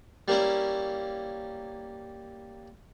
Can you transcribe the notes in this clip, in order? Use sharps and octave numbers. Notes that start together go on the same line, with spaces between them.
G3 A#3 C#4 E4